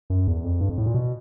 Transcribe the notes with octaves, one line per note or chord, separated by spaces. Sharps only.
F#2
E2
F2
G2
F2
A2
A#2
B2